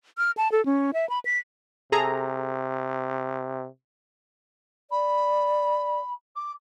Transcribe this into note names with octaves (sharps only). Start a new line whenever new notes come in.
F6
A5
A4
C#4
E5
B5
B6
C3 G#4 A4 A#5
D5 B5
D6